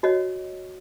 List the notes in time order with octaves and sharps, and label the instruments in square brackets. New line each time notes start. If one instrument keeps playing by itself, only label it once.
[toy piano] F#4 C#5 D#5